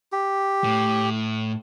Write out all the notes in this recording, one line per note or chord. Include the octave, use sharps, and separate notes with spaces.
G4
A2